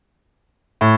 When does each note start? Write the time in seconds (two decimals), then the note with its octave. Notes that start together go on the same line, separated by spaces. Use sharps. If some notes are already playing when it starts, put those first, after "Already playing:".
0.81 A2